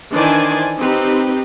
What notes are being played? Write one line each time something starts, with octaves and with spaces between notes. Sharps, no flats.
D#3 E3 D4 C5 D5 G#5
C4 D#4 G4 B4